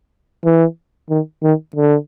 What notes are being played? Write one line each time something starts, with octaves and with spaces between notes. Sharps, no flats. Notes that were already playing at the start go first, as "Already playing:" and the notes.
E3
D#3
D#3
D3